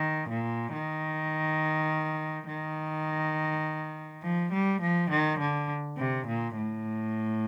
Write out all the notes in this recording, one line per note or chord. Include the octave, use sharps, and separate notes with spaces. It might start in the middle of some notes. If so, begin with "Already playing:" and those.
Already playing: D#3
A#2
D#3
D#3
F3
G3
F3
D#3
D3
C3
A#2
A2